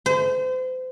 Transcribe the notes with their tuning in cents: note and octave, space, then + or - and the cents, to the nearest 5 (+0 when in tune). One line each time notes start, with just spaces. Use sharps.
C5 -35